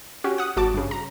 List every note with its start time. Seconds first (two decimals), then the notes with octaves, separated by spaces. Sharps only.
0.24 C#4 F#4 G4
0.38 F#5 D#6
0.57 G#1 F#4 A5 D6
0.74 G2 C#3
0.91 A#5